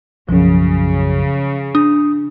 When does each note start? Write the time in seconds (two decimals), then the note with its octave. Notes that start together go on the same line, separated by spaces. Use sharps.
0.29 B1 F#2 C#3 F3
1.75 D4 D#6